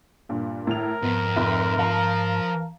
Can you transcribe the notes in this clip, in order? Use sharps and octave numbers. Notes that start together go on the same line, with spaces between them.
G2 A#2
A2 A#4 F7
F2 G#2 B3
F1 E5
F3 F5 A5 A#5